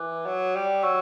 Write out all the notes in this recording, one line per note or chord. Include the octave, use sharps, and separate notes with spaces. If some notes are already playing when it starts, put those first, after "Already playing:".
Already playing: E3 D6 F#6
F#3
G3
F#3 C#6 E6